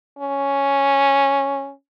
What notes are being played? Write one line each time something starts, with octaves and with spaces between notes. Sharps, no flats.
C#4